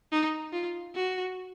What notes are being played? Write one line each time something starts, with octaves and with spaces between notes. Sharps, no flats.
D#4
F4
F#4